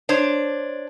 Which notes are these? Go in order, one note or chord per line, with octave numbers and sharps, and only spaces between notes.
D4 C5 C#5